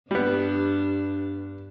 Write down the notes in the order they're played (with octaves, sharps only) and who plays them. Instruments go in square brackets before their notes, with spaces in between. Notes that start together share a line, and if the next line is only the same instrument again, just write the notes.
[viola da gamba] G2 D4 [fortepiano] G3 B3